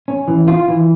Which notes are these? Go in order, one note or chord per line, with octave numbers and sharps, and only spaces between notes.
C#4
E3
F4
E3